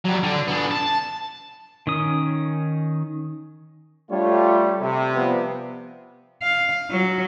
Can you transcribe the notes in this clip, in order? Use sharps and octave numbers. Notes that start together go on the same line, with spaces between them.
F#3 G3
D3 D4
B3 D4
A5
D#3 C#4 D#6
G3 A3 D4 F4 C#5
C3
F3 G3 B3
F5
F#3